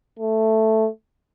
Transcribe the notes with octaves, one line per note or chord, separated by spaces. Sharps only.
A3